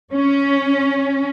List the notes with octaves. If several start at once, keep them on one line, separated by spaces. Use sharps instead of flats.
C#4